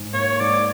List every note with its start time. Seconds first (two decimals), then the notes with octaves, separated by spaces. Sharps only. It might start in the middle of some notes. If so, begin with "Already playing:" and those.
Already playing: G#2
0.13 A#3 C#5
0.40 G#2 D5